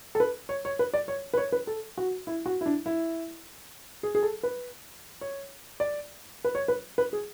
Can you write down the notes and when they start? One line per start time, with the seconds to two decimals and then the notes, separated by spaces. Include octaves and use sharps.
0.15 A4
0.20 B4
0.49 C#5
0.65 C#5
0.79 B4
0.94 D5
1.08 C#5
1.34 B4
1.37 C#5
1.52 B4
1.67 A4
1.98 F#4
2.27 E4
2.46 F#4
2.61 E4
2.66 D4
2.86 E4
4.03 G#4
4.15 G#4
4.23 A4
4.43 B4
5.21 C#5
5.80 D5
6.45 B4
6.55 C#5
6.68 B4
6.98 B4
7.13 G#4